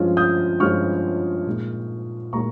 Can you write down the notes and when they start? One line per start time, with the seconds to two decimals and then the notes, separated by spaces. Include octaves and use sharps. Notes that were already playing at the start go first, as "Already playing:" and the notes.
Already playing: G2 F3 G#3 C#4 F4
0.17 D#6 G6
0.60 G2 F3 G#3 C#4 F4 C#6 F6
1.46 A#2 G#3 D#4
2.33 A#2 G#3 D#4 A#5 C#6